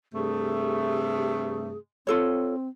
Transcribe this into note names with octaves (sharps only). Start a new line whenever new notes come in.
G2 C3 A3 G#4
C4 F4 A4 C#5